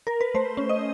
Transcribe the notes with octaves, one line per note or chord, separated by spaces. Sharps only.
A#4
B4
A3 C5
C#4
D#5